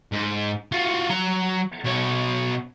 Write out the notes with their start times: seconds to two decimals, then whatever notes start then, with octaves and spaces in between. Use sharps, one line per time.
0.12 G#2
0.72 F4 F#4
1.09 F#3 A#5
1.84 B2 C#5